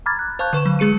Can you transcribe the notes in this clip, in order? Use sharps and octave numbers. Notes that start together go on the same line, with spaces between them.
A#5 B5 D6 F6 G#6 A6
F#6
C5 F5 A5 C#6 F#6 G6
D3 B4 C#6 E7
F#3
G#3 G#4 C#7 D#7